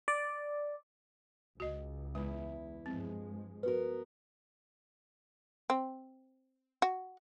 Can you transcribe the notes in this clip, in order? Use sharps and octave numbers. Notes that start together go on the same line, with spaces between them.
D5
C#2 F#4 D#5
E2 G#3 E4
G2 F3 G#3 C4
B3 F#4 A#4 B4
C4
F#4